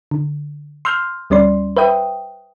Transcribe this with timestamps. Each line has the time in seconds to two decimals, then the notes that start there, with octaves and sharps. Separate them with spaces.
0.11 D3
0.85 C6 E6 F6 G6
1.30 D2 G3 C#4 D5 C6
1.77 B4 C5 E5 G5 D#6